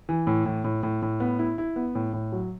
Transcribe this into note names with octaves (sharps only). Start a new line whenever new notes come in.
E3
A2
A2
A2
A2
A2
B3
E4
E4
B3
A2
A2
F#3